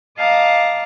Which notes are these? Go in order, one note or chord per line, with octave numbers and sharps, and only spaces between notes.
D#5 F5 A5 A#5 D6